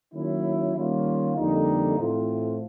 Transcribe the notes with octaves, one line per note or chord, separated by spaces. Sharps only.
D#3 F#3 A#3 C#4 E4
D#3 G3 A#3 C#4 F4
F2 D3 G3 A#3 D#4
A2 E3 A3 C4 F4